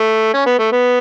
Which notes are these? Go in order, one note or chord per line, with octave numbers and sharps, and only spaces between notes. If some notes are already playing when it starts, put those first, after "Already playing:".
Already playing: A3
C#4
B3
A3
B3